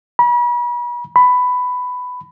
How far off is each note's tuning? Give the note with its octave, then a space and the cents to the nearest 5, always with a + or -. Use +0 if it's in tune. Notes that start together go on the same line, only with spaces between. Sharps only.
B5 -40
B5 +10